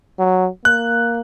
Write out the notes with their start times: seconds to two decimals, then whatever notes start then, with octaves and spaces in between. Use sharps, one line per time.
0.19 F#3
0.65 A#3 F#6